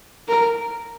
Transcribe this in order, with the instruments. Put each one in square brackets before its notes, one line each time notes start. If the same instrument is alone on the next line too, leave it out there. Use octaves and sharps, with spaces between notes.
[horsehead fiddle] A#4